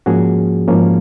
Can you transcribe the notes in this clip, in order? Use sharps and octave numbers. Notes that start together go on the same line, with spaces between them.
G#2 F3 A#3 C#4 F#4 G#4
G#2 F3 A#3 C#4